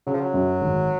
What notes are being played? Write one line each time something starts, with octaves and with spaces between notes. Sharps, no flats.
C#3 F#3
F3
F#3
F#2
G#1